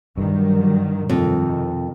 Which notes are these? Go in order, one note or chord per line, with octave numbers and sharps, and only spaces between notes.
G2 D#3 F#3 G3
F2 C3 D#3